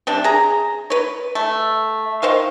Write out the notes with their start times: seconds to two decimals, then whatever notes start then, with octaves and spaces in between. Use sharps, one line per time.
0.07 C3 G3 D4
0.24 G#4 A#5
0.90 B4 C#5
1.35 A3
2.22 D#3 C5 F5 C#6